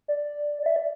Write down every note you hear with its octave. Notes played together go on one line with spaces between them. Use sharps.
D5
D5
E5
D5